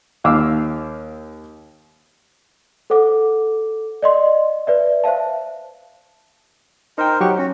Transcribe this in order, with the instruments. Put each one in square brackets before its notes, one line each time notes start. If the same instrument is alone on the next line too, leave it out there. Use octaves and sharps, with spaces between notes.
[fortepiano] D#2 F5 D6 E6
[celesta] A4 C5 F#5 D6
D5 D#5 C6
B4 D5 E5
C5 E5 F5 A5
[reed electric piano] D#4 G5 [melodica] A#4 C5
[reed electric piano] F#3 G4 C#6 [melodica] F#5
[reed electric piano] C#4 [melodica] F#4